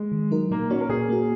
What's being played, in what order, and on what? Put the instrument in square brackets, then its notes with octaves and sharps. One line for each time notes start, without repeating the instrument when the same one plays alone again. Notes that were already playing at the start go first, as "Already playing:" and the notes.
Already playing: [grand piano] G#3
[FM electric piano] D#3
F#3 D#4 A#4
[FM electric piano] A#2 [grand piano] A#3
[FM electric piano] A#3 F#4 [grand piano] C#4
[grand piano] A#4
[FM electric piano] A#2 [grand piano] G#4
[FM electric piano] A#3 F#4